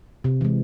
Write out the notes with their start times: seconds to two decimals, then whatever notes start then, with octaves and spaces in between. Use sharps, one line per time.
0.24 C3
0.41 E3 G#3